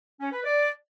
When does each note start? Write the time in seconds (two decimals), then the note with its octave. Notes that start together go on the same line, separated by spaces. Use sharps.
0.20 C#4
0.32 B4
0.44 D5